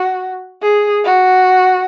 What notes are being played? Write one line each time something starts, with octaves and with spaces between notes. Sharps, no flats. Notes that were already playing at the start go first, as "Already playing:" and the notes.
Already playing: F#4
G#4
F#4